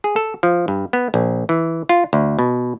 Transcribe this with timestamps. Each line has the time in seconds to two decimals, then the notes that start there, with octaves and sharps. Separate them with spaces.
0.04 G#4
0.16 A4
0.43 F3
0.68 G2
0.93 B3
1.14 A#1
1.49 E3
1.89 F4
2.13 D2
2.39 B2